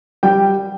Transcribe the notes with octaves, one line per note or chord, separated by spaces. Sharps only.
G3 G5